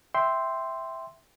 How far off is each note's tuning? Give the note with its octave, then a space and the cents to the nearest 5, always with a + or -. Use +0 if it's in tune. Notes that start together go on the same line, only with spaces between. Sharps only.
E5 +0 G5 +0 C6 +0